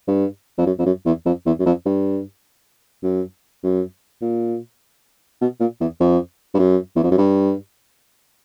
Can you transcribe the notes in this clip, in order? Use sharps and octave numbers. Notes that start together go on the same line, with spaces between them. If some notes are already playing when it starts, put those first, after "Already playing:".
G2
F2
F#2
F2
F#2
E2
F2
E2
F#2
F2
G2
F#2
F#2
A#2
B2
A#2
E2
F2
G2
F#2
E2
F2
F#2
G2